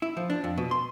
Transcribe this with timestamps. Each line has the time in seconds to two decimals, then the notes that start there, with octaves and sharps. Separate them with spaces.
0.02 E4
0.17 F3
0.30 D4
0.44 F2
0.58 B2
0.71 C6